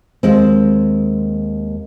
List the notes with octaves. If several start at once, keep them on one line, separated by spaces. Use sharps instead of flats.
D#2 G#3 C4